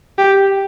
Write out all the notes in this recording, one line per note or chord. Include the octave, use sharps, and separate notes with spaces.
G4